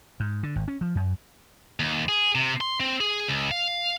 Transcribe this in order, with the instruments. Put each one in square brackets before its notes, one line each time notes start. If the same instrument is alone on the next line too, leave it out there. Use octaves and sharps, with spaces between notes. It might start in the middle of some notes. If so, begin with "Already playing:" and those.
[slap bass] G#2
D3
G#1
C#4
F3
F#2
[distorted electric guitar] D#2
G#4
C3
C6
C4
G#4
C#2
F5